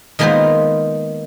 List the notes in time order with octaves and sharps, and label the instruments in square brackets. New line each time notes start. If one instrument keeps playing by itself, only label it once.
[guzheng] D#3 G#3 A#3 B3 F4 C5